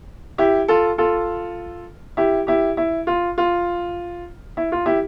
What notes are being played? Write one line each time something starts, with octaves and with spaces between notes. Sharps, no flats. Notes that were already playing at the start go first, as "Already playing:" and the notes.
E4 G4
F4 A4
F4 A4
E4 G4
E4 G4
E4
F4
F4
E4
F4
E4 G4